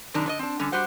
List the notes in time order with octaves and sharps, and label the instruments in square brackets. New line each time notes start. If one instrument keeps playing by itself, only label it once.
[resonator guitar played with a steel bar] F#2 C3 D#3 D4
D3 C#5 D#5
C4 D4
D3 G3 C#4
G3 F#4 G4 C5 F#5